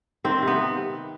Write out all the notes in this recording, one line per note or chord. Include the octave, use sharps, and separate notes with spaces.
D#3 C4
C3
B3